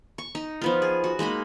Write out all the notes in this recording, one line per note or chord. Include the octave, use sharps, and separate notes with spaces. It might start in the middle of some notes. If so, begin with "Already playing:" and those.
C#6
D#4
F3 B3 F4
G#4
F#4
G#3 A#3 D#4 B5